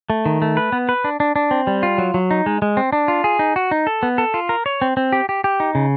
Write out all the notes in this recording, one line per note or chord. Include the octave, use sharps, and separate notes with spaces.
A3
D#3
A3
B4
B3
B4
D4
D4
D4
C4
G3
F4
F#3
F#3
D#4
G#3
G#3
C4
D4
F4
G#4
D#4
F#4
D#4
A4
B3
A4
F4
A#4
C#5
C4
C4
G4
G4
G4
D#4
C#3